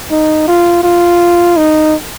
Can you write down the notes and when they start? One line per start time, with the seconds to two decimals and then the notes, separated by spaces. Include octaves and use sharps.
0.11 D#4
0.48 F4
0.84 F4
1.57 D#4